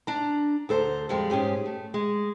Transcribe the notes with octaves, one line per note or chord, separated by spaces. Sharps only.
D4 A#5
D2 A4 C5 A#5
F2 G3 G#3
G#2 C#4 G4 G#4
A3
G#3